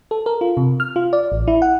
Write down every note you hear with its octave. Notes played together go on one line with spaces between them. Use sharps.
A4
A#4
F4
C3
F6
F4
D5
A1
E4
F#5